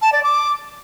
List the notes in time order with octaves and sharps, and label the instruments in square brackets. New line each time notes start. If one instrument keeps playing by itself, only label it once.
[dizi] A5
D5
D6